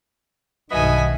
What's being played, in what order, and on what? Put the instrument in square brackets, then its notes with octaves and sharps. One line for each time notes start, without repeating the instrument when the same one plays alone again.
[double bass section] B1 G2 D#3 [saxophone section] B2 B3 D#5 [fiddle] E5 G#5